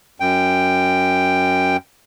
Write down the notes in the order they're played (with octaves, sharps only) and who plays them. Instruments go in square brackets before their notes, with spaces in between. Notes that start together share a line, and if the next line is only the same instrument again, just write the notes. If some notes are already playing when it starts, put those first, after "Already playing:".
[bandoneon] F#2 G5